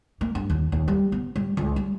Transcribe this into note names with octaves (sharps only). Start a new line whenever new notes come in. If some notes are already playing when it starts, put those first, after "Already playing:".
A#3
G2
D#2
D#2
G3
B3
G3
C#2
G3